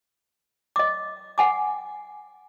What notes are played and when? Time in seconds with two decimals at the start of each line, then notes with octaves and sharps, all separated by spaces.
0.76 D#5 D6
1.38 F#5 G#5 D6